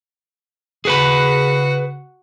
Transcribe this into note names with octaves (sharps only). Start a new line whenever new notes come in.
C#3 F#4 G#4 B4 B5